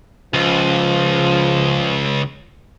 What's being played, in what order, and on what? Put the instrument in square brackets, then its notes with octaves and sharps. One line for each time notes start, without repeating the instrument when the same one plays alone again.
[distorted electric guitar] C#2 [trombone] F3